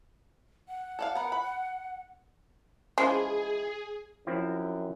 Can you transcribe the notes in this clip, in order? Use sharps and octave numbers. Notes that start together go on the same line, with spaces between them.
F#5
A4 D5 F5
B3 A#4
B5
E3 F3 G#3 C#4 G#4 C5
F#2 F3 C4 E4